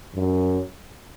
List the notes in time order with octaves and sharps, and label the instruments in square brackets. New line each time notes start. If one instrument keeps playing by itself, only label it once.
[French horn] F#2